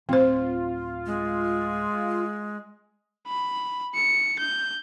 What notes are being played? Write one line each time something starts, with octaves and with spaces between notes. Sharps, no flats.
D1 C4 F4 C5
G#3
B5
C#7
G6